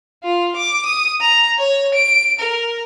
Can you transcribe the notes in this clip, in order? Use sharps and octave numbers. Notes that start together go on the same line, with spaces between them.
F4
D6
D#6
A#5
C#5
D7
A#4